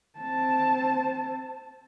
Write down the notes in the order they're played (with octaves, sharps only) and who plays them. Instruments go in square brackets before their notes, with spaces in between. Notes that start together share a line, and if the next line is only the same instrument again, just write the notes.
[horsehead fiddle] C4 A5